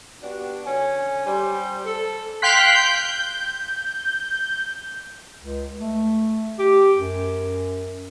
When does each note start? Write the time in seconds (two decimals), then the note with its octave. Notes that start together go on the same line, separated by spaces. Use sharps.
0.23 B3 D4 F#4 G4
0.65 D3 C#4 G#5
1.25 G3 C5
1.85 A4
2.42 F5 G5 C6 F#6 B6
2.74 G6
5.41 C#2
5.81 A3
6.59 G4
6.97 F#2